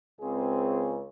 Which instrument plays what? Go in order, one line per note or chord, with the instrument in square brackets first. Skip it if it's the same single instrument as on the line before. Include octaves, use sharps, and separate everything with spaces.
[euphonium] C#2 [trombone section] C4 G#4